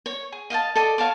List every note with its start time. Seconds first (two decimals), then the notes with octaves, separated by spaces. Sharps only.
0.06 C#5
0.32 G#4
0.50 D#5 F5 G5 A5
0.76 A4 D5 D#5
0.98 C#5 F5 A5 D6